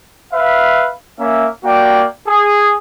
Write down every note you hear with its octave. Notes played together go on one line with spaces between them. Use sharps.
B4 E5 F5
A#3 C#4 E5
A#3 F#4 D5 G5
G#4